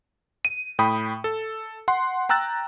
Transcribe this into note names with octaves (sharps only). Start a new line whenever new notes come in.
D#7
A2 G5 B5 D#6
A4
F#5 C6
G5 A#5 E6 F#6 A6